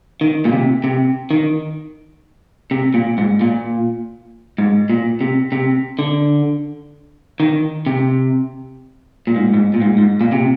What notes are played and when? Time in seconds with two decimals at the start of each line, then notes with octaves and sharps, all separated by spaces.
0.21 D#3
0.45 A#2
0.52 C3
0.84 C3
1.31 D#3
2.71 C3
2.94 A#2
3.18 G#2
3.41 A#2
4.58 G#2
4.90 A#2
5.21 C3
5.52 C3
5.99 D3
7.40 D#3
7.86 C3
9.27 A#2
9.36 G#2
9.54 G#2
9.74 A#2
9.82 G#2
9.98 G#2
10.21 A#2
10.32 C3